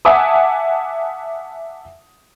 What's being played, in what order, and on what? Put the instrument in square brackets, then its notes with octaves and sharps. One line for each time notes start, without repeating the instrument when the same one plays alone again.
[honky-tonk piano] E5 F#5 G#5 A5 D6 D#6